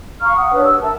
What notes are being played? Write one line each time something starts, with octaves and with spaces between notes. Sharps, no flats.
F5 A#5 C#6 F6
F#5 D#6
D4 B4 C#5
G4 E6
A#4 E5 A5